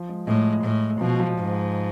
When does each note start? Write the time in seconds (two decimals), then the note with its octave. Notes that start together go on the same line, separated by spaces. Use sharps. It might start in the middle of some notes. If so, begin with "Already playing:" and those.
Already playing: F3
0.09 G#3
0.27 A2 G#3
0.65 A2
1.01 B2 F3
1.20 F3
1.39 G#2